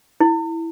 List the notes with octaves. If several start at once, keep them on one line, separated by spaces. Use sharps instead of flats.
E4